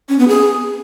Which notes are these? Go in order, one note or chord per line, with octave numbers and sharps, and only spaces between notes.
C#4
B3
G#4